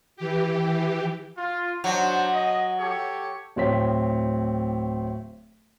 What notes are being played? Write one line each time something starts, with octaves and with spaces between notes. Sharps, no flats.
E3 G4
F4
F#3 D4 D#4 C5
D#5
G4 A4 C#5
D1 A2 C4 C#5 B6